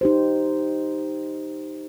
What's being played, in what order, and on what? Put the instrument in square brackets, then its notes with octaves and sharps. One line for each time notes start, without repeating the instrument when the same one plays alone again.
[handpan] D#4 G4 C5